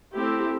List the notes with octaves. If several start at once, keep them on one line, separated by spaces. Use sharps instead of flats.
A3 C4 E4 G4